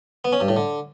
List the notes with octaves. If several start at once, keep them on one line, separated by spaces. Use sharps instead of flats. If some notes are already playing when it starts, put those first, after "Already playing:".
B3
C#4
G2
A2
D3